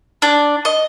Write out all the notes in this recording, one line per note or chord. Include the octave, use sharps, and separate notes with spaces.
D4
D#5